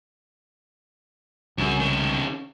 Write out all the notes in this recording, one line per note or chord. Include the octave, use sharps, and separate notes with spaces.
C2 F#2 C#3
D#3 C#4